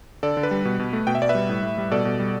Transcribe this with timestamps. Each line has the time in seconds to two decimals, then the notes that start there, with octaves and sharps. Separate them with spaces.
0.23 D3 A4 D5
0.37 D3
0.43 B4
0.51 G3
0.65 B2
0.79 B2
0.93 A3
1.07 B2 G5
1.15 E5
1.22 B2 D5
1.29 B4 E5
1.35 G3
1.49 A2
1.63 A2
1.78 G3
1.91 B2 A4 D5
2.05 B2
2.19 G3